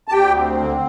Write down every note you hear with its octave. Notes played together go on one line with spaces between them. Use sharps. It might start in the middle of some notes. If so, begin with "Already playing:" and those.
A5
D2 G4 G5
C4
D3